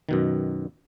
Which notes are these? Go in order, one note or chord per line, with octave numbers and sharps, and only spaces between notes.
F#2 B2 D#3